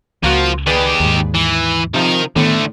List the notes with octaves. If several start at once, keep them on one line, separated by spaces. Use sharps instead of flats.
C#2 F3 A#3 F4 F#4
D#3 G4 G#4 B4 D5
D#2 G#2
E3
C3 D#3 F3 A#4
A2 D3 D#3 A3 B3